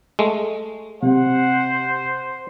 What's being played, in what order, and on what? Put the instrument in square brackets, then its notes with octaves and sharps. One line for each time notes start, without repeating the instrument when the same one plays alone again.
[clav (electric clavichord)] G#3 A3
[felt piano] C3 [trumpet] C5 [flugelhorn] F#5